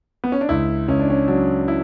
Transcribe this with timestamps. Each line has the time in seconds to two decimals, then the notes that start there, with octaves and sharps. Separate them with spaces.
0.24 B3
0.32 C#4
0.41 D4
0.49 C#2 E4
0.88 C#2 C#4
0.99 D4
1.10 C#4
1.28 F#3 D4
1.68 E4